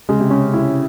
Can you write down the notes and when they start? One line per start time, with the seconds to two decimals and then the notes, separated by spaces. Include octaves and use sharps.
0.09 C#3 G#3
0.19 C3
0.30 C#3 C#4
0.53 C3 E4